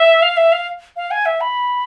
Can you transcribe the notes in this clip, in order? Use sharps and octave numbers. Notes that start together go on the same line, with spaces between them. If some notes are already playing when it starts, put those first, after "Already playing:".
Already playing: E5
F5
E5
F5
F5
G#5
E5
B5